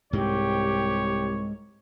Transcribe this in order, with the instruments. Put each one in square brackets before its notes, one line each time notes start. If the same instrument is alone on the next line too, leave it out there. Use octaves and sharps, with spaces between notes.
[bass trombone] C2 [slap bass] G#2 G#3 [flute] G4 [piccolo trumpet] C#5